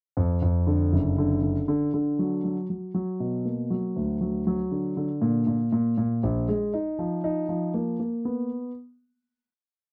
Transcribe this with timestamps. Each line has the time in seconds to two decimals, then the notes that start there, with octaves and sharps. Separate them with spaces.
0.17 F2
0.42 F2
0.67 D3
0.93 F#1
1.18 D3
1.43 D3
1.68 D3
1.94 D3
2.19 F#3
2.44 F#3
2.70 F#3
2.94 F#3
3.20 B2
3.45 A#3
3.70 F#3
3.96 D2
4.21 F#3
4.47 F#3
4.71 D3
4.97 D3
5.21 A#2
5.47 A#2
5.72 A#2
5.98 A#2
6.23 A#1
6.49 G#3
6.74 D#4
6.99 F3
7.24 D#4
7.49 F3
7.74 A#3
8.00 A#3
8.25 B3